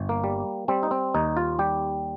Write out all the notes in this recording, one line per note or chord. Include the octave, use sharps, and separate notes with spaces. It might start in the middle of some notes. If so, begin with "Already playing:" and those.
Already playing: G1
A#3
G3
G3 C4
D#4
C4
D#2 D#4
F4
G3 G4